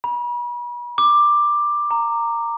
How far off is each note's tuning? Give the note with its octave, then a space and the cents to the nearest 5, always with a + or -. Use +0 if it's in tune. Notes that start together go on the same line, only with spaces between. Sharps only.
B5 -40
D6 +10
A#5 -10